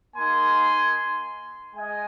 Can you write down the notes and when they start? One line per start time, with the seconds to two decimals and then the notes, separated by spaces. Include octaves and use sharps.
0.16 A#3 D#4 G#5 C6
1.75 G#3 D#5 G#5